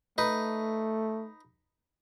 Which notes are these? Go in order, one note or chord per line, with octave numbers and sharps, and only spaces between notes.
A3 D#4 B4